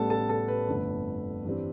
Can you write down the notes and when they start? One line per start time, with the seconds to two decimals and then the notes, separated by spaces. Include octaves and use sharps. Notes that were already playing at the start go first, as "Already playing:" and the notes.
Already playing: A1 A2 G3 B3 A4 A5
0.10 A4 A5
0.29 A4 A5
0.48 B4
0.68 G1 F2 D3 A3
1.44 G2 E3 G3 C4